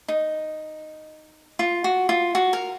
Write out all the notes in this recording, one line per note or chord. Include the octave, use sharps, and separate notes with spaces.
D#4
F4
F#4
F4
F#4
A#4